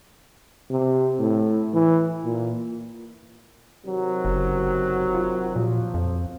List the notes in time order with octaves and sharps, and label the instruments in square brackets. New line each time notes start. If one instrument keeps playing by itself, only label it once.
[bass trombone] C3
A2
E3
A#2
[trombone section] C3 D#3 F#3
[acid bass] F#1
F4
[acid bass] A#2 [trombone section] F3
[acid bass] F2